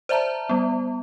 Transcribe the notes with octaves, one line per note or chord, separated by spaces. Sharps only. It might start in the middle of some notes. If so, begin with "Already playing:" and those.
C5 D5 E5 A5 A#5
G3 B3